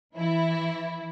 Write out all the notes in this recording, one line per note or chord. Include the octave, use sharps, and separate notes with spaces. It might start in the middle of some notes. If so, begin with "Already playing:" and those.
E3 E4